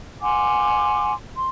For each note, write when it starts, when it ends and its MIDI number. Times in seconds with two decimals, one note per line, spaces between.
0.22 1.12 78
0.22 1.12 80
0.22 1.12 84
0.22 1.12 86
1.35 1.47 84